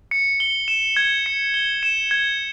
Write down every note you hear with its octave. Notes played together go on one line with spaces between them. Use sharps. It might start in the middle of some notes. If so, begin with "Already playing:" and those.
C#7
G7
E7
G#6
C#7
G7
E7
G#6